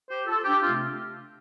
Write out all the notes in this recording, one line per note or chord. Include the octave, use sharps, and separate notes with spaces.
G4 C5
F4 A4
D4 G4
C3 A3 C4 F4